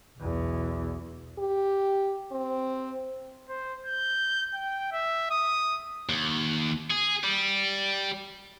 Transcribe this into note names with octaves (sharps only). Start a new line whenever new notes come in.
B1 E2
G4
C4
C5
G6
G5
E5
D#6
D#2
G#4
G3